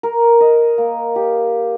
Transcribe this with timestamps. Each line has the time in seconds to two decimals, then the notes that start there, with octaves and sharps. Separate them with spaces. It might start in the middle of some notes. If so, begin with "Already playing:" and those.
0.03 A#4
0.41 D#5
0.78 A#3
1.16 G4